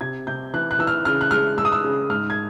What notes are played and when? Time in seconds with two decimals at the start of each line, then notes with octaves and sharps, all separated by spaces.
0.01 C3 G#6
0.27 C3 G6
0.54 E3 F#6
0.71 F#6
0.79 E3 E6
0.87 F6
1.05 C#3 F6
1.21 F#6
1.31 G#3 F6
1.58 G#3 E6
1.65 D#6
1.72 E6
1.84 C#3
2.09 G#2 F6
2.30 G#6